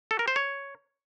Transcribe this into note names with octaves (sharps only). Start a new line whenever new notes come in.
A4
A#4
C5
C#5